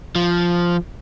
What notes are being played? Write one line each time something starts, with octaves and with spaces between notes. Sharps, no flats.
F3